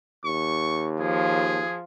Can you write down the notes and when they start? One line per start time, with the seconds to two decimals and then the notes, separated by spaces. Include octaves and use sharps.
0.24 D#2 C#6
1.00 F3 G#4